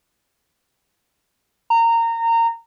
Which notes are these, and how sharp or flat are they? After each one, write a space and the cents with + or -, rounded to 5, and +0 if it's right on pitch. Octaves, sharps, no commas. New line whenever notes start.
A#5 -20